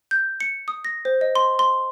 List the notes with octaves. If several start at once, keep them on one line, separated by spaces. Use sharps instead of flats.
G6
C#7
D#6
A#6
C5
D#5
C6
C6